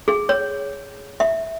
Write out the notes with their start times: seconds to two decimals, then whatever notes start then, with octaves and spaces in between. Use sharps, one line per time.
0.08 G#4
0.29 C#5
1.20 E5